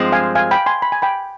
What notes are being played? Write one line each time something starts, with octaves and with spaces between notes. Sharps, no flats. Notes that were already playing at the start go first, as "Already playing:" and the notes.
Already playing: G2 F3 G#3 C4
F5 G#5
F5 G#5
G5 B5
G#5 C6
B5
G#5
G5 B5